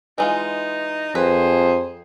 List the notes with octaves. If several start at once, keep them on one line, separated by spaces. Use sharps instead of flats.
E3 G#3 D#4 F4
F2 G#4 B4 C5